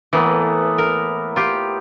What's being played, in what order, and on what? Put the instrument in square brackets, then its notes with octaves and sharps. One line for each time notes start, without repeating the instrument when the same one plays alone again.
[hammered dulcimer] A2 A#3 B3 [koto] E3
[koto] A#4
F4 G4